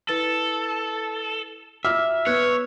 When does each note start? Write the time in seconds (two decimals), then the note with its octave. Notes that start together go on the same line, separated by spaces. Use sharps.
0.09 E4 A4 B4 A6
1.85 F4 F#4 E5 D6 F6
2.27 B3 C#5 F#6 G#6